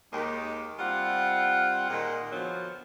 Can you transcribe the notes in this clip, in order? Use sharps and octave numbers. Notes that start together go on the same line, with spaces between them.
D#2 D#3 G#3 A#3 G4
G3 C4 F4 F#5
A#2 D#3 G#3
D3 F3 F#3 B3